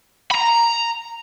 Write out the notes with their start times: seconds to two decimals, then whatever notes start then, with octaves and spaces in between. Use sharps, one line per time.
0.31 A#5 B5